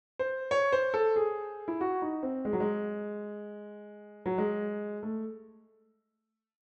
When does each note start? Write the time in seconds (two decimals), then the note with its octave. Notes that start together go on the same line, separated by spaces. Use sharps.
0.19 C5
0.51 C#5
0.72 C5
0.94 A4
1.16 G#4
1.68 E4
1.81 F#4
2.02 D#4
2.23 C4
2.45 G#3
2.53 F#3
2.60 G#3
4.26 F#3
4.38 G#3
5.03 A3